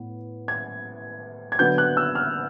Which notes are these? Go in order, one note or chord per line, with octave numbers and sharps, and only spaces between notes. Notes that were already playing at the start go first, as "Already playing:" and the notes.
Already playing: A2 B3
G#6
G#6
D3 F#3 B3 G6
F#6
E6
F6